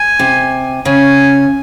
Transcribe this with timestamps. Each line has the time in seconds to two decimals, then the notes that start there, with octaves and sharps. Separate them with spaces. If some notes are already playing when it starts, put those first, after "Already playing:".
Already playing: G#5
0.19 C3
0.85 C#3 G#5